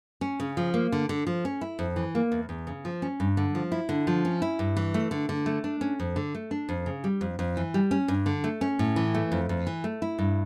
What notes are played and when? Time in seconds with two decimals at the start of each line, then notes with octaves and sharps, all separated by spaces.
0.21 C#4
0.40 C#3
0.57 F3
0.74 A#3
0.92 D3
1.09 D3
1.27 F3
1.45 C#4
1.61 E4
1.79 F2
1.96 E3
2.15 A#3
2.32 E2
2.49 E2
2.67 C#3
2.85 F3
3.02 C#4
3.20 G2
3.37 D3
3.55 F3
3.72 E4
3.89 D3
4.07 F3
4.25 C#4
4.42 E4
4.59 G2
4.77 E3
4.94 A3
5.11 D3
5.29 D3
5.46 A3
5.64 D4
5.81 C#4
6.00 F2
6.16 D3
6.35 A3
6.51 D4
6.69 F2
6.86 C#3
7.04 G3
7.21 F2
7.39 F2
7.57 E3
7.74 G3
7.91 C#4
8.08 G2
8.26 D3
8.44 A3
8.61 C#4
8.79 A2
8.96 E3
9.15 A3
9.32 F2
9.49 F2
9.67 E3
9.84 A3
10.02 E4
10.19 G2